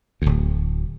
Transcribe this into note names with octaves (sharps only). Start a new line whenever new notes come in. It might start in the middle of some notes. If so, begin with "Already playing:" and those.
D1 D2